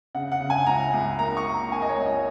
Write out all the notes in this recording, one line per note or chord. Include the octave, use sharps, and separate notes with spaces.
C#3 F#5
F#5
C#3
G#5
C#2 A#5
C#2
A#3 A#5
C#6
A#3
A#5
A#3 G#5
D#5
C#5
C#2
D#5